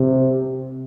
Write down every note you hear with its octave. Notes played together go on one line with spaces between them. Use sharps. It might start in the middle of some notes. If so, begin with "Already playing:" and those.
Already playing: C3